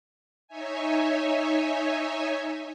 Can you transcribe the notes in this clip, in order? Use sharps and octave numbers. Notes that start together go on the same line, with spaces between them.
D#4 C#5 E5 G#5